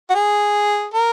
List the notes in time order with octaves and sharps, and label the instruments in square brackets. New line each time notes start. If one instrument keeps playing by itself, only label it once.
[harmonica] F#4
G#4
A#4